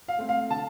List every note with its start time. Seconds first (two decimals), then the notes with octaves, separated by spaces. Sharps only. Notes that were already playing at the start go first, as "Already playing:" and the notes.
0.08 F5
0.18 A3 C4
0.29 F5
0.50 D3 A5